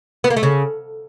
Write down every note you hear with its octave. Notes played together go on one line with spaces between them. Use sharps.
B3
A#3
A3
C#3